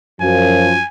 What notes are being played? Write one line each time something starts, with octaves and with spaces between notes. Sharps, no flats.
F#2 F3 G#5